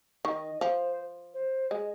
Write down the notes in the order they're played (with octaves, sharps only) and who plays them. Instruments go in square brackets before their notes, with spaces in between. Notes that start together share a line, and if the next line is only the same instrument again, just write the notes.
[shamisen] D#3 [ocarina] D#5
[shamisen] F3 [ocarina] C5
[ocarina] C5
[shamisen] G#3 [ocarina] D#5